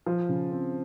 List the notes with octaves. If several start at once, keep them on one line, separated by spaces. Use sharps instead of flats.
F3
C#3
C4